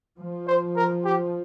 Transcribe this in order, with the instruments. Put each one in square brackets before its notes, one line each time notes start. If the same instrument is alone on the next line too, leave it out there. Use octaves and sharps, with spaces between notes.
[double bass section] F3
[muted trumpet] C5
A#4
G4